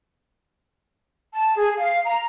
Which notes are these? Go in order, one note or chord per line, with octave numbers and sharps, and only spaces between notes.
A5
G#4
F5
A#5